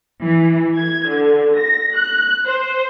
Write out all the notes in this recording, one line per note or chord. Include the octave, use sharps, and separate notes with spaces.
E3
G#6
D3
A#6
F#6
C5